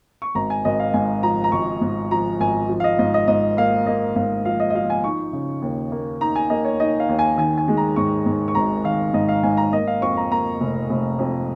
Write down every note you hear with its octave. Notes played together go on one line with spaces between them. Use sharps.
C#6
G#1 A#5
G#5
G#1 D#5
F5
G#2 G#5
F3 A#5
A#5
G#1 C#6
G#2
F3 A#5
G#1 G#5
F3
F5
D#5
G#2 D#5
D#5
G#2 D#5
A#3 F5
A#3 D#5
G#2 F5
F3 F5
D#5
D#5
F3 F5
G#5
D#4 C#6
C#3
D#2
A#3
D#4 A#5
G#5
A#3 D#5
C#5
D#4 D#5
F5
D#2
G#5
D#3 G#5
G#5
G#3
A#5
G#2 C#6
G#2
C#6
G#1 A#5
D#3 F5
G#2 D#5
F5
G#2 G#5
A#5
A#3 D#5
F5
F2 C#6
A#5
A#3 A#5
F1
F1
F2